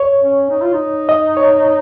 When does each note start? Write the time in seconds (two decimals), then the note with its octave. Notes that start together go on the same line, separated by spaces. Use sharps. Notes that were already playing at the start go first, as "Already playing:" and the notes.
Already playing: C#5
0.21 C#4
0.50 D#4
0.62 F4
0.74 D#4
1.09 D#5
1.37 C#5